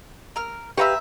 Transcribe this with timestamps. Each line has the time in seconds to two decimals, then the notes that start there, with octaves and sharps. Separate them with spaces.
0.36 A#4 F6
0.77 G4 B4 E5 F5 A#5 C#6